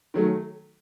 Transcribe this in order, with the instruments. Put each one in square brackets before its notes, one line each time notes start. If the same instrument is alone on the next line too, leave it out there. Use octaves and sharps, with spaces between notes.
[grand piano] D#3 F#3 A3